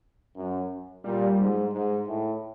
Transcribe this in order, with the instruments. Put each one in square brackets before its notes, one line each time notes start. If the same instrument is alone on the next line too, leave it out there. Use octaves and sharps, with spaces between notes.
[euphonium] F#2
[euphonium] A#2 [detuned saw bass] G3
[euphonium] G#2
G#2
A2